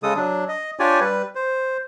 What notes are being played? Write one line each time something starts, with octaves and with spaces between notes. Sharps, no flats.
C#3 G#3 A4 D#6
F#3 D4
D#5
D4 F4 G4 C#5 D5 G#5
G3 B4
C5